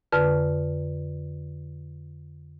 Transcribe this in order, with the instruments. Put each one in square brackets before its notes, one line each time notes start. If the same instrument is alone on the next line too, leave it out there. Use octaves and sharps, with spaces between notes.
[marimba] F2 D3 B4 F6